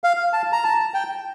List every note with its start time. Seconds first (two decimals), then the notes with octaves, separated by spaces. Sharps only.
0.04 F5
0.33 A5
0.52 A#5
0.64 A5
0.94 G5